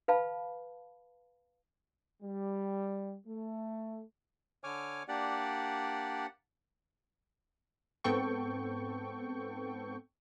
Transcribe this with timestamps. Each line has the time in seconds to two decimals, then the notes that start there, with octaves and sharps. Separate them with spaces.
0.08 B4 F5 A5 B5
2.22 G3
3.27 A3
4.64 D3 C#5 G#5 D6 F6
5.08 A#3 D4 G4 D5 F#5
8.04 G#2 B3 C4 A4 G5 C#6